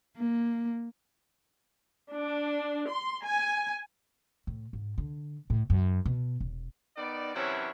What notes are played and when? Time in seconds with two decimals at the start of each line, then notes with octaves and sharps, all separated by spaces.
0.17 A#3
2.12 D4
2.87 C6
3.25 G#5
4.47 A2
4.73 G#2
4.98 D3
5.50 A2
5.70 F#2
6.06 B2
6.40 E1
6.97 D#3 B3 D#4 D5
7.35 C3 E3 F#3 C#4 D4 E4